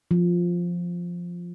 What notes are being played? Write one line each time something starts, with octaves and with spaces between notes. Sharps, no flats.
F3